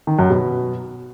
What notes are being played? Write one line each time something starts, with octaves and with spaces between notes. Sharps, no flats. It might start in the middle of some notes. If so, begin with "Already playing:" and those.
D#3
F#2
B2